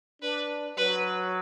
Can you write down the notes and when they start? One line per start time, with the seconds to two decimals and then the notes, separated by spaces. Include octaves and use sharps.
0.22 D4 B4
0.77 F#3 B4